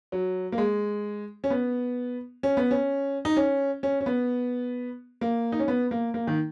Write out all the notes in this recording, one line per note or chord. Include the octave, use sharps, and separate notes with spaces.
F#3
A#3
G#3
C#4
B3
C#4
B3
C#4
D#4
C#4
C#4
C#4
B3
A#3
D#4
C#4
B3
A#3
A#3
D#3